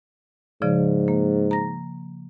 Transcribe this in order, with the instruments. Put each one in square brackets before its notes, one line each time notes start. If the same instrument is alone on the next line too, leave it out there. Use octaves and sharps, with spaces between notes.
[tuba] G#2 [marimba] C#3 F3 D5
[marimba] A#3
A#5 A#6